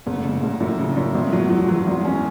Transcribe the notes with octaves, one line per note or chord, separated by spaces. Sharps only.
F#1 B3
A3
C#3
G#3
F#1 A2 A3
F#2
C#3
F#2
G#1 B2 B3
A2 F#3 A3
E2 E3 F#3
E2 E3 F#3
G#1
C#4